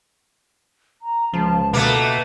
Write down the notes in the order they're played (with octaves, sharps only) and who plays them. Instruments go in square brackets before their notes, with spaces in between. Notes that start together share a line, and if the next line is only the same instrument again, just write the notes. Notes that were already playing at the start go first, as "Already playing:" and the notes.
[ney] A#5
[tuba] C#2 [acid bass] F3 [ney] A5
[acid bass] B2 [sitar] A3 A#3 [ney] B4